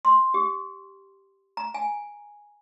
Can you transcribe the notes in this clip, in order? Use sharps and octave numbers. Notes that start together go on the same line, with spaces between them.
C6
G4
A#5
G#5